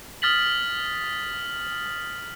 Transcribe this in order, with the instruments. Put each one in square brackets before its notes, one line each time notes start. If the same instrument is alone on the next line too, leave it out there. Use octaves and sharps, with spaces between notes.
[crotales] D#6 F6 A6 B6 F#7